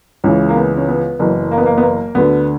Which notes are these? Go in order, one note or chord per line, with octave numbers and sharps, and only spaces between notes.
C#2 C#3 E3 C#4
A#3
B3
C#4
B3
F#1 F#2 E3 B3
A#3
B3
A#3
B3
A#3
D2 D3 B3